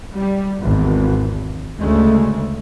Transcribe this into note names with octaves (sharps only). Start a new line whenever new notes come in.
G3
G#1 E2
D2 C#3 G#3 A3